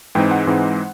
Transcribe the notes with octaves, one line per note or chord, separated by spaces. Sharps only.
G#2 E3 G#3 C4 D#4 G5
F#5
G#2 E3 G#3 C4 D#4